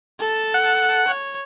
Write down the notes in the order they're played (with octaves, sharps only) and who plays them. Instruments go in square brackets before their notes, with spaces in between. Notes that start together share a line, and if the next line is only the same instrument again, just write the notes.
[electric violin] A4 A5
[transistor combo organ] F#5
[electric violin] C#5